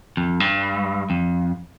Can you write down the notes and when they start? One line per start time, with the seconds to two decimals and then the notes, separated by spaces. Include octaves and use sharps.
0.17 F2
0.40 G2
1.10 F2